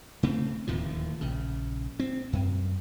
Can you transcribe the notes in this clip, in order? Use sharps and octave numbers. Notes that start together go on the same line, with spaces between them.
C#3 A3 C4
D1 D#2 A2 F3
A#1 C#3
C4
F#2